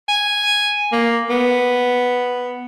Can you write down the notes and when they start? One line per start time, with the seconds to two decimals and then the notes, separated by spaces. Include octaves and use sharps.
0.08 G#5
0.92 A#3
1.30 B3